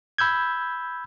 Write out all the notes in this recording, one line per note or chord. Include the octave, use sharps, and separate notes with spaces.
B5 E6 G6 G#6